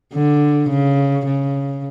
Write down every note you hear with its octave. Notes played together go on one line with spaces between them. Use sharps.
D3
C#3
C#3